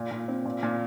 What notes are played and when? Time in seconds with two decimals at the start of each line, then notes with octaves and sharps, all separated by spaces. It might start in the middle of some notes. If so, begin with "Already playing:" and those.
Already playing: A#2
0.11 A#2
0.28 C4
0.45 A#2
0.63 A#2